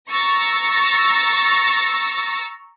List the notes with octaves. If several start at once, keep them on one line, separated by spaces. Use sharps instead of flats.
A#5 C#6 E6 A6 A#6